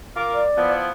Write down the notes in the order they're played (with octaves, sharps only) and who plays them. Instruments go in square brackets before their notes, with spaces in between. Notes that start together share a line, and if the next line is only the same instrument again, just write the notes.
[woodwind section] F4 A#4 D6
[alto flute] D5
[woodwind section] F3 B3 E4